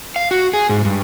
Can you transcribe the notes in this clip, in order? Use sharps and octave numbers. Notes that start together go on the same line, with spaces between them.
F5
F#4
G#4
G#2
G2